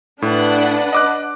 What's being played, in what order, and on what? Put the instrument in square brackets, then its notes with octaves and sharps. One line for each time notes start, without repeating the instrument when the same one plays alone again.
[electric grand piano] A2 [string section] D4 B4 F#5
[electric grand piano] D#5 D6 F#6